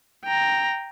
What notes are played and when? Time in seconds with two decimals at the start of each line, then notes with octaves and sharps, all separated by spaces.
0.24 G5 A#5